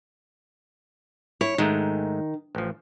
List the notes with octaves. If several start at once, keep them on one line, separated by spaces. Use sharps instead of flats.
E4 C#5
G#2 D#3 G#3 A3
A1 F3